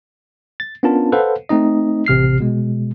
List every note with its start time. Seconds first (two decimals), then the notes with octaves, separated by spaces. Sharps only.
0.60 A6
0.83 B3 C#4 D4 F4 A#4 A5
1.12 A4 B4 C5 F5 F#5
1.49 A3 C4 D#4 D#5
2.06 A1 C3 F6 C7
2.40 B2 G#3